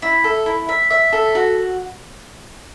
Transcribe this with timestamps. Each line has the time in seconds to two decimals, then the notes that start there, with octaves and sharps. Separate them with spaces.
0.02 E4
0.24 A4
0.46 E4
0.69 E5
0.90 E5
1.13 A4
1.35 F#4